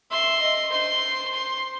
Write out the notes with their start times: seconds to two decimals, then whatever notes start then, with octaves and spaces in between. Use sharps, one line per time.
0.11 E5 C6
0.41 D#5
0.72 C5 C6
1.34 C6